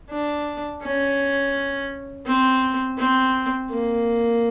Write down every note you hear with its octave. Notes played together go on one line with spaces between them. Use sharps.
D4
C#4
C4
C4
A#3